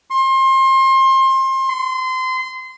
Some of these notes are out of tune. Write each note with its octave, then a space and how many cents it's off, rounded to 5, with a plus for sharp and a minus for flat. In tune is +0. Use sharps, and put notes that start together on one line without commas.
C6 +30
C6 -25